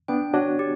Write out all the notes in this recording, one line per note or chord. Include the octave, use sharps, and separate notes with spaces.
B3 D4 G5
D4 F#4 C#5
G4